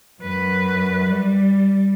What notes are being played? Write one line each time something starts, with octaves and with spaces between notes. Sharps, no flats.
F#2 B4
G3